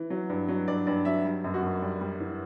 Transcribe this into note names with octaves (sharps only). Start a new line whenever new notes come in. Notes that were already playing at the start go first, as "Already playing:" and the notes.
Already playing: E3
F#3
G2
F#3
G2 D5
G2 D5
F#3 E5
G3
F#2
F#4
F#2
G3
G3
E3